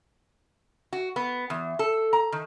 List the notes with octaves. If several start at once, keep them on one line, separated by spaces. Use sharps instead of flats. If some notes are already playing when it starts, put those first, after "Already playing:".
F#4
B3
E2
A4
A#5
D#3